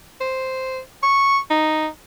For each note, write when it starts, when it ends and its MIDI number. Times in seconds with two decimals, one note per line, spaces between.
0.21 0.81 72
1.03 1.39 85
1.50 1.87 63